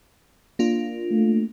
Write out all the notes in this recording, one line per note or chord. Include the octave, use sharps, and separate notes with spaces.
A#3 D4 F4
A3